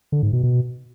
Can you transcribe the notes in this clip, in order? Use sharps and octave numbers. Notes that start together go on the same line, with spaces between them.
D3
G#2
B2
B2